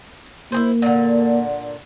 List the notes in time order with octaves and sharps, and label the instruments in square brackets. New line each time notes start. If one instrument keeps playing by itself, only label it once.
[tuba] A#3 [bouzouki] E4 G#4 C5
[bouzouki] A#2 D3